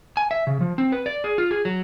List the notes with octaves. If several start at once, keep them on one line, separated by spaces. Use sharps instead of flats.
G#5
E5
C#3
F3
C4
B4
D5
G#4
F4
G#4
F#3